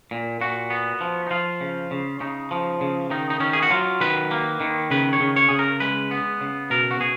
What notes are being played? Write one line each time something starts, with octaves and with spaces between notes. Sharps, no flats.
A#2
A#2 F#4
B3
F3
D#4
F3 F4
C#3
C#3
C#3 D#4
F3
C#3
D#3 D#4
D#4
D#3 C#4
G#4
F#4
F#3 F4
D#3 B4
A#3
D#3
C#3 B4
C#5
C#3
C#5
C#3 G#4
A#4
G#3 B4
B3
C#3
B2 A#4
F#4
B2 G#4